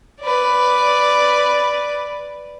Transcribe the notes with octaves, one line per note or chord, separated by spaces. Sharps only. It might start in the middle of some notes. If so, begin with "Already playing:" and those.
B4 D5